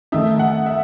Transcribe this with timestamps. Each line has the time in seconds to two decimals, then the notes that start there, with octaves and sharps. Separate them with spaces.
0.12 D#3 A3 D#4 E5
0.39 F#5
0.66 E5